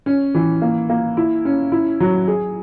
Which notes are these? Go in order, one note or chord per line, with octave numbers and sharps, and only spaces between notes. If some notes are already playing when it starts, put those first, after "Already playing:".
C#4
E3
A#3
A#3
E4
C#4
E4
F#3
G#4